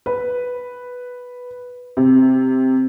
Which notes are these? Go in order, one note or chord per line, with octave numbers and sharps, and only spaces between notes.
B4
C3